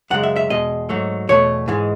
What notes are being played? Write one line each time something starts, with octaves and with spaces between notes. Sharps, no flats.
F#2 C#3 G#3 F#5
E5
E5
E2 B2 G#3 D#5
G#2 F#3 A3
E2 B2 A3 C#5
G#2 E3 G#3